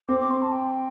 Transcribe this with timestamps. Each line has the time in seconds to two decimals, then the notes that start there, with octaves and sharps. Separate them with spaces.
0.08 C4 D6
0.20 D6
0.30 C6
0.42 A5
0.52 G5